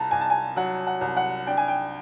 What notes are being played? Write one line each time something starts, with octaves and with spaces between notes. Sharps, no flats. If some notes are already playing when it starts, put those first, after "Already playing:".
Already playing: C2 A5 A#5
C2 G#5
A5
G#5
F#3 F#5
F#5
C2
F#5
D4 G5
G#5
G5